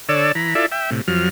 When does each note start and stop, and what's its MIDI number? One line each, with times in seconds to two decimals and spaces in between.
0.09 0.32 50
0.09 0.32 69
0.09 0.32 73
0.09 0.32 74
0.09 0.32 88
0.35 0.54 52
0.35 0.54 82
0.35 0.54 83
0.55 0.66 64
0.55 0.66 65
0.55 0.66 69
0.55 0.66 74
0.55 0.66 76
0.72 0.90 76
0.72 0.90 79
0.91 1.01 45
0.91 1.01 48
1.08 1.29 41
1.08 1.29 53
1.08 1.29 54
1.08 1.29 89